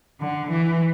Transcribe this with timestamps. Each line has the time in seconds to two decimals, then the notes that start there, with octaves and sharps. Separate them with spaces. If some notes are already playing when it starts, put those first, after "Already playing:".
0.21 D3
0.50 E3